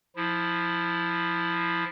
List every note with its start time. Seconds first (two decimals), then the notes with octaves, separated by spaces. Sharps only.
0.16 F3 E4